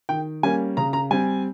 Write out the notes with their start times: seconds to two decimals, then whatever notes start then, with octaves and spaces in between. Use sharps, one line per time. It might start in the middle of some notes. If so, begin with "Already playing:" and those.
0.09 D#3 G5
0.43 G3 A#3 C#4 G#5
0.77 C#3 A#5
0.93 A#5
1.11 G3 C4 G#5